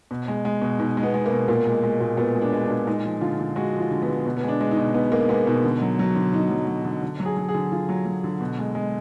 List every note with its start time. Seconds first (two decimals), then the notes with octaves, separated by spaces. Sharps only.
0.11 B2
0.28 G#3
0.45 G#3
0.62 B2
0.79 B2 D#4
0.97 G#3
1.03 B3
1.14 G#3
1.26 A#3
1.31 B2
1.48 A#2 A#3
1.65 G#3
1.83 G#3
2.00 A#2
2.17 A#2 B3
2.36 G#3
2.41 D4
2.53 G#3
2.64 D4
2.70 A#2
2.87 G#3 D#4
3.05 F3
3.21 D3 F4
3.39 D3
3.56 G#3 F#4
3.74 F3
3.80 F4
3.91 D3
4.02 B3
4.08 D3
4.26 B2
4.37 B3
4.43 G#3 D4
4.61 G#3
4.71 D#4
4.77 B2
4.94 B2 B3
5.12 G#3 A#3
5.29 G#3 B3
5.46 B2 D#4
5.64 D3
5.81 F#3
5.99 F#3
6.15 D3
6.33 D3 D#4
6.51 F#3
6.67 F#3
6.85 D3
7.02 D3
7.20 F#3
7.25 G#4
7.37 F#3
7.48 G#4
7.55 D3
7.72 D3 F4
7.89 F#3
8.06 F#3
8.24 D3
8.41 B2
8.59 G#3
8.75 G#3